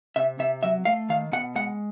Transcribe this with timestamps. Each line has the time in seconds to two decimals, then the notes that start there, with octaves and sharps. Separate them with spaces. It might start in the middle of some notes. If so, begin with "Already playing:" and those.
0.16 C3 E5
0.39 C3 E5
0.63 F#3 E5
0.85 A3 F5
1.09 D#3 F5
1.32 B2 F#5
1.55 G#3 F#5